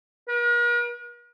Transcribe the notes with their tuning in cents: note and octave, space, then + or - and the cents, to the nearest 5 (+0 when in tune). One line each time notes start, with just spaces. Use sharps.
A#4 +45